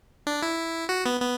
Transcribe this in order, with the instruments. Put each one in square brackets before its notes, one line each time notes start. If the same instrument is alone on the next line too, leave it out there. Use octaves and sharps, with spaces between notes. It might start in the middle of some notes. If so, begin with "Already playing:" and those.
[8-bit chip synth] D4
E4
F#4
B3
B3